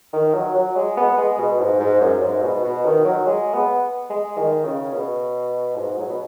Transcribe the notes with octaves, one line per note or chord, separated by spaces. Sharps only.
D#3
F#3
F#3
G#3
B3
G#3
B2
G#2
G#2
F#2
G#2
B2
B2
D#3
F#3
G#3
B3
G#3
D#3
C#3
B2
G#2
F#3
B2